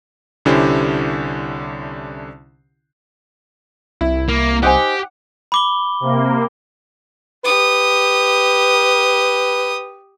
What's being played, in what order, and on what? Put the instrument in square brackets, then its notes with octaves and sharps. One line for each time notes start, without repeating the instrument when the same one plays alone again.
[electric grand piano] C2 D3 C#4 E4 G4 C5
[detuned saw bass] C2 [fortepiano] E4
[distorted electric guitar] A#3
[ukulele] D#4 C5 G#5 [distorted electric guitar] G4 [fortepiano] F#5
[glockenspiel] B5 D6 G7
[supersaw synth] C3 A#3
[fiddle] G4 D#6 [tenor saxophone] B4